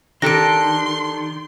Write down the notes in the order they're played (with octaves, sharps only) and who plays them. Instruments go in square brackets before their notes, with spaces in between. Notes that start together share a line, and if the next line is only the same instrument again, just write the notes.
[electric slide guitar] D#3 [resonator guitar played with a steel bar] D4 G4 A4 [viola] C6 [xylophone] A#6 D7